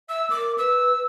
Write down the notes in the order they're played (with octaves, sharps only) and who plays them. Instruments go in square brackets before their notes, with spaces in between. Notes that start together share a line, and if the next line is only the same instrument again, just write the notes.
[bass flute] E5 [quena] E6
[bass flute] A#4 [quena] D6
[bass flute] B4 [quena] E6